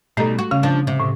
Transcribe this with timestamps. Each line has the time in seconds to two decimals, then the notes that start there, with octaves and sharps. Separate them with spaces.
0.17 B2 G3 A3 D#4 A4
0.39 F#4
0.51 C#3 C#4 F5
0.63 F3 D4
0.87 C3
1.00 A2